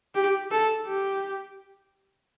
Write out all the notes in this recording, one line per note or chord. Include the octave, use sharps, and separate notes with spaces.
G4
A4
G4